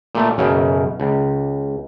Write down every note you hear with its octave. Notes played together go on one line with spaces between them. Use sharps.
A#2 A3
B1 F#2 C#3
C#2